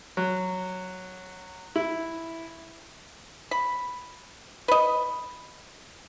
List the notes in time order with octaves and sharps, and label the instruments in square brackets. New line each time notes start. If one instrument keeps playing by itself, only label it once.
[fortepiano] F#3
E4
[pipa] B5
B4 D#5